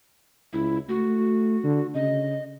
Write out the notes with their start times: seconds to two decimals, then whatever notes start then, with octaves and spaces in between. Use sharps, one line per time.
0.53 C#2 E4
0.89 A3 F#4
1.64 D3
1.94 C#3 D#5